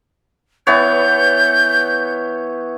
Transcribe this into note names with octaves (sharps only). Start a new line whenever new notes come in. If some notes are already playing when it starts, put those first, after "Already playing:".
E3 B3 C#5 G6